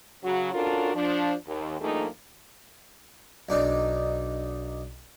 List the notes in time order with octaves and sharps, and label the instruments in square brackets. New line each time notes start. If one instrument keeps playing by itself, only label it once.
[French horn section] C#3 F#3 F#4
C#4 D4 F4 F#4 A4 A#4
F3 D4
D#2
G2 F3 A3 A#3 D#4 G#4
[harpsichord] B1 D4 D#4